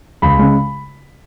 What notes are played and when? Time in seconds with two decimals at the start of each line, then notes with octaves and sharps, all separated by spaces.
0.22 C#2 B5
0.38 C#3 G#3